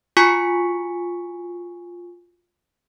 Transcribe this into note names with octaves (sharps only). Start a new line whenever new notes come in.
F4 F#4 G#5 C#6 B6 C#7